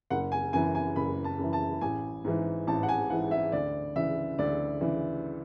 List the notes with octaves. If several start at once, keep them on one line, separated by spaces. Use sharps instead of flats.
F#1 F#5
G#5
F#2 E3 G#5
G#5
F#1 B5
A5
F#2 E3
A5
A1 G#5
G#2 E3
A1 A5
F#5
G#5
G#2 E3 F#5
E5
D2 D5
C#3 E3 E5
D2 D5
C#3 E3